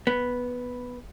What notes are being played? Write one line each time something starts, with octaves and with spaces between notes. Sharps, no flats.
B3